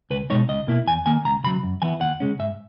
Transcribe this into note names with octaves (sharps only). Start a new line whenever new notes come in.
C#2 B4
B2 G#3 D#4 C#5
C#2 D#5
B2 A#3 E4
E2 G#5
D#3 A#3 G#5
C#2 A#5
C#3 F#3 B5
F#2
E3 B3 E4 G#5
D#2 F#5
C#3 G#3 C#4
G#2 E5